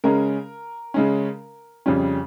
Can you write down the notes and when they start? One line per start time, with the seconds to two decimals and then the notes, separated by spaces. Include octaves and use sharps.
0.04 C#3 G#3 C#4 A#4
0.94 C#3 G#3 C#4
1.86 F2 C#3 G3 C#4